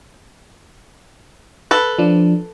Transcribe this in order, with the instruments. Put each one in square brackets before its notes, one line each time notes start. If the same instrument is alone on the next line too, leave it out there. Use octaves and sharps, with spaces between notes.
[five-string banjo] A4 B4
[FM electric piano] F3 D4